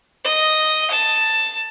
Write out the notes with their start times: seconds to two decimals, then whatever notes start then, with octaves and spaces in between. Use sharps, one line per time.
0.24 D#5
0.90 A5